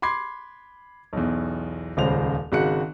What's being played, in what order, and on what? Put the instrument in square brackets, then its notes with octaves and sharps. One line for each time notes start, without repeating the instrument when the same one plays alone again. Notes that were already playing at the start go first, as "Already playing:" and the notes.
[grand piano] B5 C6 D6 G#6 C7
B1 E2
D#1 C#2 C#3 C5 F7
G#1 C#3 F#4 F5 F#6 C#7